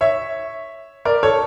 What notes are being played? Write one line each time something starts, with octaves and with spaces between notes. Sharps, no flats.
C#5 E5
A#4 D5
A4 C#5